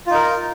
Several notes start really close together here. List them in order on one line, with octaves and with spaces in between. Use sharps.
F4 D#4 A#4